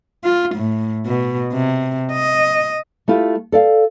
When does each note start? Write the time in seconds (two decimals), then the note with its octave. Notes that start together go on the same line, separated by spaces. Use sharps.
0.24 F4
0.56 A2
1.07 B2
1.53 C3
2.12 D#5
3.08 A3 E4 F4 G4
3.52 A4 D5 F5